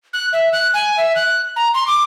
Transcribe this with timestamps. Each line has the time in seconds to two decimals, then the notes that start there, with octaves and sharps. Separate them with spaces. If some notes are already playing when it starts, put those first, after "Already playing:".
0.13 F#6
0.33 E5
0.53 F#6
0.74 G#5
0.97 E5
1.16 F#6
1.56 A#5
1.74 C6
1.87 D6